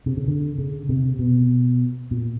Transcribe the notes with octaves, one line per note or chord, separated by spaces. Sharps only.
C3
C#3
D3
C#3
C3
B2
A#2